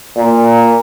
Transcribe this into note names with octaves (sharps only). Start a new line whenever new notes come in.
A#2